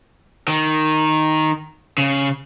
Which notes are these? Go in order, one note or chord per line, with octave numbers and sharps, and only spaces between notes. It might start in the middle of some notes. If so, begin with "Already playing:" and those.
D#3
C#3